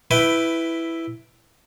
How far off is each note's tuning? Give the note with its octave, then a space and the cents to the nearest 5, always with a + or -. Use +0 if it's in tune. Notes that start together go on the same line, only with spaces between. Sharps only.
E4 +0 B4 +10 G5 -5